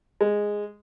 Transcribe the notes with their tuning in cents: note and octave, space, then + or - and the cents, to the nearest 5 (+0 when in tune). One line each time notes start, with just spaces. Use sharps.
G#3 -5